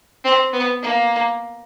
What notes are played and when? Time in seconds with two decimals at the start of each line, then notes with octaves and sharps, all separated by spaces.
0.25 C4
0.53 B3
0.82 A#3